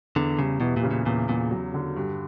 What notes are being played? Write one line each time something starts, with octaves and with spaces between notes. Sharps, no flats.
E2 D3
C#3 G3
B2 E3
A#2
C#3
A#2
E2 A#2
E2 A#2
F#3
D3
G2